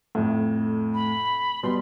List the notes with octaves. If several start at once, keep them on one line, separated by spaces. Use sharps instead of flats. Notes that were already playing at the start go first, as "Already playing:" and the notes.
F2 A2
B5
B2 G3 C6